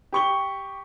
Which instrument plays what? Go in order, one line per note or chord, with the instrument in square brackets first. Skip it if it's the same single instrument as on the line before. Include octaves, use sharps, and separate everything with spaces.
[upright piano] G4 C#6 G7